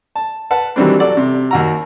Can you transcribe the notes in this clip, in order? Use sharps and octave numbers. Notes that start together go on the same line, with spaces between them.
A5
B4 F#5 A5
D#3 E3 F#3 G3 C4 D4
F#3 F#4 A4 D5
C3
D#2 F#4 A#5